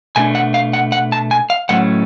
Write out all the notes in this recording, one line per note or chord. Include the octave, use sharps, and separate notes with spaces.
B2 A3 D4 G#5
F#5
F5
F#5
F#5
A5
G#5
F5
A2 F#3 A3 C#4 F#5